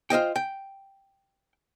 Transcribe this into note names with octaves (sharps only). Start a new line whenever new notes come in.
F4 C5 D#5 G5
G5